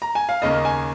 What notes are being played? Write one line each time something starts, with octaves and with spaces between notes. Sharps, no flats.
A#5
G#5
F5
D#2 C#3 A#3 D#5
G#5